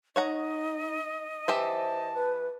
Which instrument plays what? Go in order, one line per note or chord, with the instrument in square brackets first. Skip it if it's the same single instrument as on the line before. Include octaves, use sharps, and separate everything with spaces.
[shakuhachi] D#4 [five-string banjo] C#5 F#5 A#5 [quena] D#5
[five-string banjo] E3 G4 E5 [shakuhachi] C5 [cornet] A5
[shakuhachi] B4